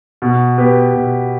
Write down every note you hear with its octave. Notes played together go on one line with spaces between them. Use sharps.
B2
B3 G4 B4
B2